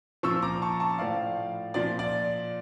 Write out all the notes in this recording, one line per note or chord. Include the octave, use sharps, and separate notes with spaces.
A#2 F3 C#6 E6
A#5 D6
A5 C#6
A5 C#6
A2 F3 D5 F5
A#2 F3 D5
D5